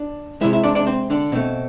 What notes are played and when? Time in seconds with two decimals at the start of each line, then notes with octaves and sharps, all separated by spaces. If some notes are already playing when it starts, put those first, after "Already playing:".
Already playing: D4 D5
0.41 G#3 E4 E5
0.44 C3
0.53 E4 E5
0.64 D4 D5
0.75 D4 D5
0.86 C4 C5
1.10 D3 D4
1.32 B2 A3 C4